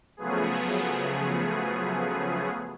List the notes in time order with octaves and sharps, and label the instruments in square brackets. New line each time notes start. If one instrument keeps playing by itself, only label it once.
[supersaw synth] C#3 F3 F#3 A3 B3 G#4